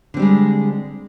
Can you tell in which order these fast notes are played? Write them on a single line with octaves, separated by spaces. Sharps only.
D3 C4 G3 G#3